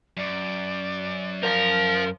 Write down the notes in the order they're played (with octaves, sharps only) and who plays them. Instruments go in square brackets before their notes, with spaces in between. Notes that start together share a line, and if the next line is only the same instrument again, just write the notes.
[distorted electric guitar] F#2 [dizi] D5
[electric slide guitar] A#4 [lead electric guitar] C5 F5